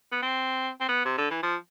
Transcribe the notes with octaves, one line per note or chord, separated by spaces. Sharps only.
B3
C4
C4
B3
C3
D3
E3
F3